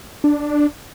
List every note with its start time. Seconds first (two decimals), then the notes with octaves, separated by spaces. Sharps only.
0.24 D4